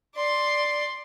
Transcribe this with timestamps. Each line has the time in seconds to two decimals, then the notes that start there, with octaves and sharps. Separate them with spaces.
0.15 D5 C6